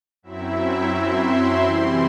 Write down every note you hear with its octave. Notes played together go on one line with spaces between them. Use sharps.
F#2 F#3 C4 E4 E5
C6
C3 E3 G3 C4 E4